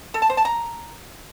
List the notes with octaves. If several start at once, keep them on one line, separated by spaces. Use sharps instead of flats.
A4
A5
C5
A5
A#5